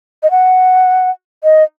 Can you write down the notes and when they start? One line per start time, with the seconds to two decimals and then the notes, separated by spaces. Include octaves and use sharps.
0.23 D#5
0.31 F#5
1.44 D#5